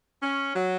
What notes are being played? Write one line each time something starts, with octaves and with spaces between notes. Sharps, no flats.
C#4
F#3